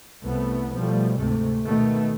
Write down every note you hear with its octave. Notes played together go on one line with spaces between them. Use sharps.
C2 A3 B3
B2 F3 G3 A3
D2 G#2 C3 A3
B2 D#3 A3 B3